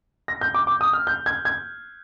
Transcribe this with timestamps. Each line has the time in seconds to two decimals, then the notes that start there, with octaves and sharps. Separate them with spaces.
0.28 A#6
0.41 G6
0.54 D6
0.67 D6
0.81 D#6
0.93 F6
1.07 G6
1.26 G#6
1.45 G#6